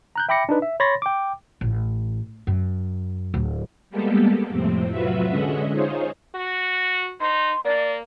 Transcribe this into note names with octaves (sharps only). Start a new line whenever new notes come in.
A#5 F#6 G6
E5 G5 B5 D6 A#6 C#7
D4 D#4 B4
E5
C#5 B5 C6 A6 A#6
G5 D6
A1
F#2
D1
G3 G#3 A#3 B3 G4 A4
F2 A2 C3 C4
F#3 F4 F#4 B4 E5
D3 G#3 C#4 D#5 E5 F#5
D#4 F4 G#4 C5 C#5
F#4
D#4 C6
A#3 D5